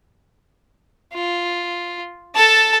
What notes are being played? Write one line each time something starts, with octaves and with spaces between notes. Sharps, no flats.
F4
A4 A5